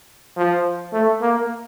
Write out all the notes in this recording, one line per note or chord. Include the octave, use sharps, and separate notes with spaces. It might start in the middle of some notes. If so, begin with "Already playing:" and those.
F3
A3
A#3